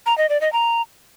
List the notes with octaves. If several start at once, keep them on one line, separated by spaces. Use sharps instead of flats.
A#5
D#5
D5
D#5
A#5